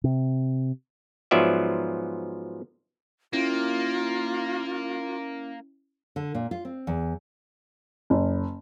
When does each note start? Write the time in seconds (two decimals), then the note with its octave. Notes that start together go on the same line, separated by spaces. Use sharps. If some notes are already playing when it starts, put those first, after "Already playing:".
0.04 C3
1.31 G#2 F3 F#3 B3 D5 E5
3.33 A#3 C#4 E4 F4
6.16 D3
6.34 A#2
6.51 F4
6.65 C4
6.87 E2
8.10 F#1